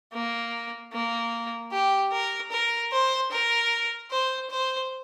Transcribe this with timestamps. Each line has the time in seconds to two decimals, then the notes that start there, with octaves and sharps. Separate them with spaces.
0.13 A#3
0.93 A#3
1.72 G4
2.12 A#4
2.52 A#4
2.92 C5
3.31 A#4
4.11 C5
4.50 C5